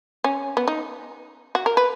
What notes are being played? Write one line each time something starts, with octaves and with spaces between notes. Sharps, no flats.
C#4
B3
D#4
F#4
A#4
B4